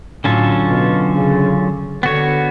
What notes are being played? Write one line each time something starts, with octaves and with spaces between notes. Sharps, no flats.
A2 D3 F#3 C#4 F4 A4
B2
C#3
D3 B3 F#4 C#5